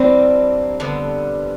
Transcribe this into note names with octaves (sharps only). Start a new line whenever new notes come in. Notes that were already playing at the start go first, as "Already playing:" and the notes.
Already playing: E3 G3 A#3 C4 D4
D3 G3 B3